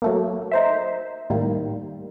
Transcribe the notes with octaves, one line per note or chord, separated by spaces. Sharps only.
F#3 A3 A#3
D#4 C5 E5
A2 D#3 G3 A#3